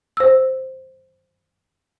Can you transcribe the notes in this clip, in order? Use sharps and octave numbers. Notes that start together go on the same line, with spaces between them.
C5 E6